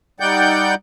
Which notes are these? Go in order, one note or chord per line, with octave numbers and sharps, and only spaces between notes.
G3 D#4 D5 F#5 G5 G6